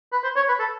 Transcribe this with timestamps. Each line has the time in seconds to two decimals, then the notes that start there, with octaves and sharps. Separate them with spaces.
0.12 B4
0.24 C5
0.36 C#5
0.48 B4
0.59 A4